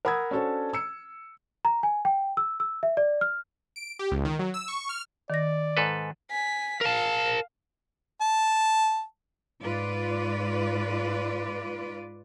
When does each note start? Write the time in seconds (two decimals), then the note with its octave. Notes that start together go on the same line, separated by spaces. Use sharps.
0.05 A#4 F#5 B5 D#6 E6 G#6
0.31 C#4 D4 F#4 A4 C5 C#5
0.73 E6 C#7
1.65 A#5
1.83 G#5
2.05 G5
2.37 E6
2.60 E6
2.83 E5
2.97 D5
3.21 F6
3.76 D7
3.99 G4
4.11 C#2
4.25 D#3
4.39 F#3
4.54 E6
4.68 C#6
4.89 F6
5.30 D#3 D5 A#6
5.77 G#2 A4 B4
6.31 G#5 B6
6.81 A#4 F5 A5
8.21 A5
9.62 G#2 F4 B4 D5